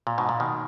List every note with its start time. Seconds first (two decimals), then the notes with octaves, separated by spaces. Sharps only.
0.07 A#2
0.18 G#2 B2
0.29 A#2
0.40 B2 D#3